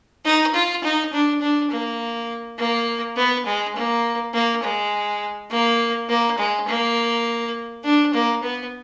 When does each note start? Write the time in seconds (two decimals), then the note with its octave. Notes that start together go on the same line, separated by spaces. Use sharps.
0.25 D#4
0.54 F4
0.84 D#4
1.13 D4
1.41 D4
1.71 A#3
2.59 A#3
3.16 B3
3.46 G#3
3.75 A#3
4.34 A#3
4.63 G#3
5.51 A#3
6.09 A#3
6.38 G#3
6.68 A#3
7.84 D4
8.14 A#3
8.43 B3